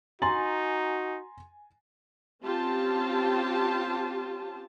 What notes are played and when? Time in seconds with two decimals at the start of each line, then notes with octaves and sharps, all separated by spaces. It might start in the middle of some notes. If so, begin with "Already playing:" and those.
0.22 D#4 F#4 G#5 A#5 C6 A6 F#7
2.44 C4 C#4 F4 G4 A5